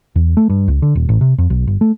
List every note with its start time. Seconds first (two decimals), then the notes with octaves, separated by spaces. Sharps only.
0.16 E2
0.37 A3
0.50 G2
0.68 C#2
0.82 D3
0.95 D#1
1.09 A1
1.21 C3
1.38 F2
1.50 B1
1.67 G1
1.81 A3